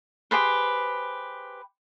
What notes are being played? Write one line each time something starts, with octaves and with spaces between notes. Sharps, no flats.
G4 G#4 B4 C5